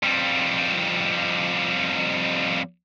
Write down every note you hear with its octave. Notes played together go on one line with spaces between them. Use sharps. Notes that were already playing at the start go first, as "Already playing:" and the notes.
F2 G3